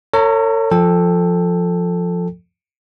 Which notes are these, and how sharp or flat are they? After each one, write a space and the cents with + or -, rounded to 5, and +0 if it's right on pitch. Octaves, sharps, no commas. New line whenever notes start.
A4 +45 C#5 +0 A#5 +0
F3 +0 A4 +0 G5 +25